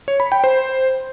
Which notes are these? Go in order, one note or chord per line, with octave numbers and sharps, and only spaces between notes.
C#5
B5
G5
C5